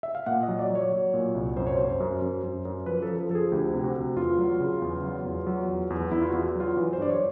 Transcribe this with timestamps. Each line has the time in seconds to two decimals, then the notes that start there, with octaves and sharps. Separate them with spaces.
0.03 E5
0.15 F5
0.26 A#2 F#5
0.43 D#5
0.48 F#3
0.59 D5
0.70 F#3
0.75 C#5
0.92 F#3
1.14 A#2
1.35 C2
1.57 F#2 C5
1.67 C#5
1.77 F#2 C5
2.00 F#2
2.22 F#2
2.43 F#2
2.65 F#2
2.86 F3 B4
3.02 A4
3.08 F3
3.19 A4
3.29 F3 A4
3.35 G#4
3.52 D2 G4
3.74 C3
3.84 F#4
3.95 D2
4.16 E2 F4
4.38 F#3
4.60 C#3
4.82 E2
5.04 F#3
5.25 E2
5.47 F#3
5.68 E2
5.90 E2
6.11 E2 E4
6.22 F4
6.28 F#4
6.33 E2
6.55 F#3 F4
6.77 E3 B4
6.93 C5
6.98 G2 D5
7.09 C#5